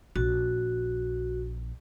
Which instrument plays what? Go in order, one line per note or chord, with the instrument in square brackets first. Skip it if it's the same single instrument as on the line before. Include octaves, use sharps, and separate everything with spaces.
[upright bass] A#1 [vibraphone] F#4